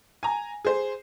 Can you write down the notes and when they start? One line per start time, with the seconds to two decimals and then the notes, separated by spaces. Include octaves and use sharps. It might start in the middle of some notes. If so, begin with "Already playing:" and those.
0.23 G#5 A#5
0.65 G#4 C5